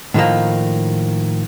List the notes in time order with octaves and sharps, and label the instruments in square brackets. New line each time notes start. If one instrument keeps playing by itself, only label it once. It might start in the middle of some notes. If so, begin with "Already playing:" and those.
[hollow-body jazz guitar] A2 D#3 F3 A#3